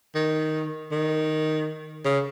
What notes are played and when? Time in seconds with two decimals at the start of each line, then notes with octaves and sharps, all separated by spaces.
0.15 D#3
0.92 D#3
2.05 C#3